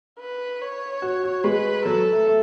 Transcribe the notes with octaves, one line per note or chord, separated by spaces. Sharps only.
B4
C#5
F#4
F#4
G#3 B4
F#3 A4
A3
A3